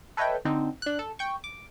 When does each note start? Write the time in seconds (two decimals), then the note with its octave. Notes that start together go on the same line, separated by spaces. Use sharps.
0.17 A4 B4 C#5 D#5 E5 G5
0.45 D3 C4 D#4
0.82 D4 F#6
0.99 A4
1.19 G5 C#6
1.44 D6